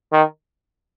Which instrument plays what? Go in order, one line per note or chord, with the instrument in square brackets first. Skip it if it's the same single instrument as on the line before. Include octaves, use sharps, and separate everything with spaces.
[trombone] D#3